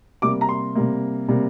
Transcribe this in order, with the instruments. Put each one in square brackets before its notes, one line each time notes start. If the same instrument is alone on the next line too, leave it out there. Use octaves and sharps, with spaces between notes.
[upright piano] C3 G3 A#3 D6
A#5
C6
C3 G3 A#3
C3 G3 A#3